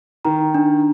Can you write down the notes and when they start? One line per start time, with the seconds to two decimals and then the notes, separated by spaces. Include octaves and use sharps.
0.25 D#3 A#5
0.54 D4